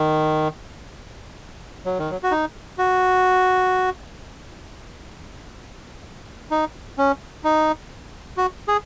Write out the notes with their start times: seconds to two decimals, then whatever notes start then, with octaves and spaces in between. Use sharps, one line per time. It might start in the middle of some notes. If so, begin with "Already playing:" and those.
Already playing: D#3
1.86 F#3
1.98 D#3
2.11 F#3
2.23 F#4
2.31 D#4
2.78 F#4
6.51 D#4
6.98 C#4
7.44 D#4
8.37 F#4
8.68 G#4